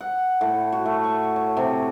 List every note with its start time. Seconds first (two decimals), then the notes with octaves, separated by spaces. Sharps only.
0.01 F#5
0.41 A2
0.72 F#4
0.86 A3
1.04 C#6
1.36 C#5
1.57 C3